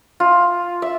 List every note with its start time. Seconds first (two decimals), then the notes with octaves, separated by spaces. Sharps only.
0.20 F4
0.82 E5